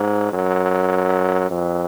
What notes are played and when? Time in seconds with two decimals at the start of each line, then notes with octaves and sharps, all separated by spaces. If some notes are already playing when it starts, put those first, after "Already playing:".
Already playing: G#2
0.32 F#2
1.50 F2